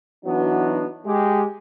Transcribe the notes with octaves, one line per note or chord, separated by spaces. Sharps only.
E3 F#3 B3 D4 D#4 F#4
G#3 G4